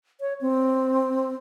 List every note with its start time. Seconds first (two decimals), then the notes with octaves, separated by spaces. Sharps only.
0.21 C#5
0.41 C4